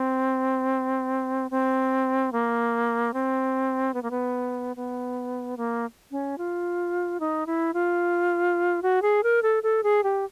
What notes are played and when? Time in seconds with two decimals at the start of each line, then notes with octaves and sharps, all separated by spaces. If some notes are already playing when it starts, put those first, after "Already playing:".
Already playing: C4
1.51 C4
2.32 A#3
3.14 C4
3.94 B3
4.03 A#3
4.11 B3
4.76 B3
5.57 A#3
6.11 C#4
6.38 F4
7.20 D#4
7.47 E4
7.74 F4
8.83 F#4
9.02 G#4
9.23 A#4
9.43 A4
9.63 A4
9.83 G#4
10.04 G4